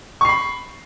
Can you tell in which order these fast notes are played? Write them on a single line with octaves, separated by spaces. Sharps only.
C#6 C7 B5